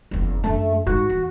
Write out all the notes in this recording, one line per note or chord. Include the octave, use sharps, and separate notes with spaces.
F#1 E2
F#2 A3 D4
G#2 F#4
E2